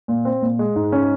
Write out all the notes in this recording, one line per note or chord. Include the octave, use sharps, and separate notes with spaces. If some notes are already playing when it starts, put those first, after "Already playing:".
A#2
C4
A#2
G#3
G#2
C#4